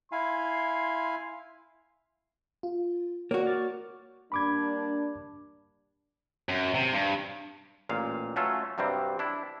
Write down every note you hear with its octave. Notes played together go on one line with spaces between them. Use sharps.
E4 F5 G#5 C6
F4
A#3 F#4 C#5 D5
D6 F6 A6
G3 A#3 D4 B5 D6 G#6
F#2
C3
G2
A1 A#2 F5
F#3 A3 C#4 F4 A4
G2 C3 F#3 G3 C4
D4 E4